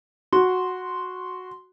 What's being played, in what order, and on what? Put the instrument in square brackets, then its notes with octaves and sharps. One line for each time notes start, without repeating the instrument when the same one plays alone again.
[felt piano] F#4 [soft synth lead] C6